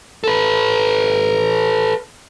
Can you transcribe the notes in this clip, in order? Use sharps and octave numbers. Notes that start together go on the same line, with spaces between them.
A4 B4